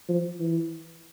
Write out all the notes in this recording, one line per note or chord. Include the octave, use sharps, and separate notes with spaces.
F3
E3